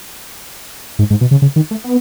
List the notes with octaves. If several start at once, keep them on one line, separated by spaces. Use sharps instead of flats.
G#2
G#2
B2
C#3
C#3
D#3
A3
B3